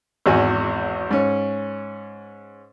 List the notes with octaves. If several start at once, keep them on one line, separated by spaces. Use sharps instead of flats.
G#1 E2 F#4 G#5
G#2 C#4